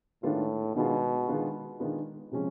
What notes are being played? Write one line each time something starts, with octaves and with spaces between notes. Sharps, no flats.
A2 D#3 G#3 B3 D4 F4
B2 D#3 G#3 B3 D4 F4
D#3 G#3 B3 D4 F4
D#3 G#3 B3 D4 F4
C3 F3 G#3 C#4